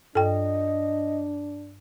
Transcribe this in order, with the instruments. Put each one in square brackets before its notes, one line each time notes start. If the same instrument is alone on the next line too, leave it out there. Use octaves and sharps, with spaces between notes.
[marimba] G2 [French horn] D4 [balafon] A4 G5 [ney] D#5